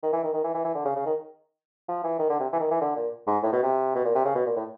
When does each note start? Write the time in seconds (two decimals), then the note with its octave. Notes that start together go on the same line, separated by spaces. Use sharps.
0.03 D#3
0.13 E3
0.23 D#3
0.34 D#3
0.44 E3
0.54 E3
0.65 E3
0.75 D3
0.85 C#3
0.96 C#3
1.06 D#3
1.89 F3
2.04 E3
2.19 D#3
2.30 D3
2.40 C3
2.53 E3
2.60 D#3
2.71 E3
2.81 D3
2.96 A#2
3.27 G#2
3.43 A2
3.53 B2
3.63 C3
3.95 B2
4.04 A#2
4.15 C3
4.25 C#3
4.35 B2
4.46 A#2
4.56 A2